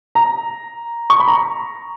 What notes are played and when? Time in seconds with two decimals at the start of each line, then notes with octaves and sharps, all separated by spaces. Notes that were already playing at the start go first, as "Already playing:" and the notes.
0.15 A#5
1.10 C#6
1.20 B5
1.28 A#5